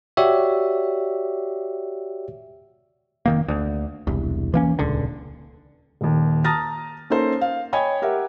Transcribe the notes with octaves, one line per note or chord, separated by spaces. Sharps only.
F#4 G4 C#5 D5 E5
F1 D#3 A#3
D2
E1 C2
E3 A#3 C#4
D#1 C#2 D3
D#1 D#2
A5 A#5 D#6 F6 A6 A#6
A#3 C#4 D#4 A4 C5
F5
C#5 D#5 G5 G#5 B5 G#6
G4 A#4 E5 F#5